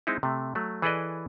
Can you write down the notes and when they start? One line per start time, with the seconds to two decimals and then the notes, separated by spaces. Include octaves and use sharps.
0.07 G#3 C4 D#4 E4
0.23 C3 A3
0.55 F#3 A3
0.82 E3 G#4 A4 B4 D5 D#5